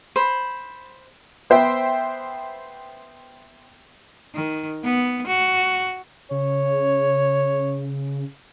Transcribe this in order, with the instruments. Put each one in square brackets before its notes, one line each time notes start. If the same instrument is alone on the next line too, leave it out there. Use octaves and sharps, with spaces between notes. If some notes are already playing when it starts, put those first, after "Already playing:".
[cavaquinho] C5 B5
[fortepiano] B3 C5 E5 G5
[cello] D#3
B3
F#4
[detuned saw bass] C#3 [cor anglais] C#5